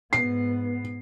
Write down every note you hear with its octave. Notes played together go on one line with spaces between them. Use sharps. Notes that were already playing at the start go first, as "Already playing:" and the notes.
G#2 B3 C7